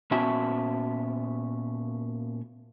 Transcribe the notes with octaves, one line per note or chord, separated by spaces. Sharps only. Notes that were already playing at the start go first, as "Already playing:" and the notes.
A#2 B3 C#4 F#4 E5 A5